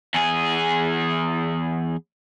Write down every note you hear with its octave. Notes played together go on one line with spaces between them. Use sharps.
E2 G#4